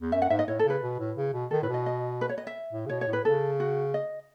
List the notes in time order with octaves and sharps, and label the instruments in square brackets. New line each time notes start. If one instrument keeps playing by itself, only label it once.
[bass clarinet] E2
[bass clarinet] F#2 [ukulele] E5
[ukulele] F#5
[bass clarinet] G#2 [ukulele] E5
[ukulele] D#5
[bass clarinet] A2 [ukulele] C#5
[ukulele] A4
[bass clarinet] C#3
[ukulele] B4
[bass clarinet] B2
A2
C#3
B2
[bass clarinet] D#3 [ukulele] A4
[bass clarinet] A2 [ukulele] B4
[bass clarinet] B2
[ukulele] D#5
D#5
B4
C#5
D#5
E5
[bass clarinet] A2
C#3
[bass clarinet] B2 [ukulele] C#5
[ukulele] C#5
[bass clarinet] A2
[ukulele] B4
[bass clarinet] C#3 [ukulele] A4
[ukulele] F#4
D#5